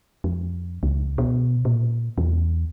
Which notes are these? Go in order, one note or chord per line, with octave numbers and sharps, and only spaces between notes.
F2
C#2
B2
A#2
E2